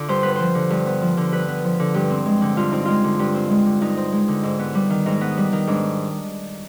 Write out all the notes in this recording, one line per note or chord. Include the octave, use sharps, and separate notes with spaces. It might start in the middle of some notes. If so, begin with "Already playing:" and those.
Already playing: D3 F4 D5
G2 C5
B3 B4
F3 C5
D3
G2
B3
F3
D3
G2 B4
B3
F3
D3
G2 G4
C4
G#3
D3
G2 F4
C4 D#4
G#3 F4
D3
G2
C4
G#3
D3
G2 D#4
C4
G#3
D3
G#2
B3
G3
D#3
G#2 D#4
B3
G3
D#3
G#2 D4